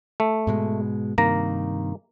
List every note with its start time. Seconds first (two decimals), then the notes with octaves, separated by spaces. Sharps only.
0.20 A3
0.47 G#2 B2 G#3
1.18 G2 C3 D#3 A#3 A#5